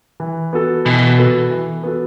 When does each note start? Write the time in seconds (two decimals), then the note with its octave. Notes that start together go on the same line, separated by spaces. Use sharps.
0.20 E3
0.53 B3 F#4 A4
0.85 B2 E3
1.18 B3 F#4 A4
1.50 E3
1.83 B3 F#4 A4